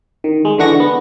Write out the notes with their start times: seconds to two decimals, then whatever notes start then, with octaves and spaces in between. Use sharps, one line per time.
0.24 D#3
0.45 G#3
0.58 D3 E3 D4 F#4 C#6 A#6
0.80 B3